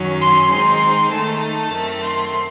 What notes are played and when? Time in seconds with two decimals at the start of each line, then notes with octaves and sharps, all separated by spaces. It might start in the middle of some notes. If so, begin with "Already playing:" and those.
Already playing: F#2 D#3 F#3 C#4
0.20 C6
0.50 D#3 G#3 C4 D#4 C6
1.11 D#3 A3 D#4 A5
1.42 A5
1.72 F#2 D#3 A3 C4
2.03 C6